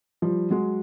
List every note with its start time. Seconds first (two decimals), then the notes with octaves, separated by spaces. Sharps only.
0.22 F3 G3
0.50 F#3 G#3